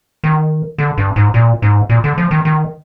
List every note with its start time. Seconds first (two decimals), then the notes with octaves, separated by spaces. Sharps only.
0.24 D#3
0.78 D3
0.98 G2
1.16 G#2
1.34 A#2
1.62 G#2
1.89 A#2
2.04 D3
2.18 F3
2.31 D#3
2.45 D#3